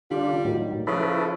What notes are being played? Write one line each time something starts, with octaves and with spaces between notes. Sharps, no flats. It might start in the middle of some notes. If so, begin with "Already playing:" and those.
D3 G3 D4 F4
A2 D#3 F#3
C#3 F3 E4 A4 B4